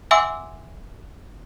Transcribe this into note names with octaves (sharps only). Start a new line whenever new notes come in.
E5 F#5 G#5 C6 D6 E6